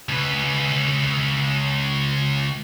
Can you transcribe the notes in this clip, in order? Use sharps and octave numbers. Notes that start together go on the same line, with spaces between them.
C#2 B4